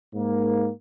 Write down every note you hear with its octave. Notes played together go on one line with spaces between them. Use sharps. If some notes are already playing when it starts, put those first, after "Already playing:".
G#2 A#3